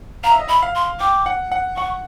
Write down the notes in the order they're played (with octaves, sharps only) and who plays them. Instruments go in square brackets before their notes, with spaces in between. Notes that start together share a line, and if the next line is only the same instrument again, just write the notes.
[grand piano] F5 [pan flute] A#5
[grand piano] E5
D#5
[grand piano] E5 [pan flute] B5
[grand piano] F5
[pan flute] C6
[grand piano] G5 [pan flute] D6
[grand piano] F#5
F#5
[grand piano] F#5 [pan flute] C#6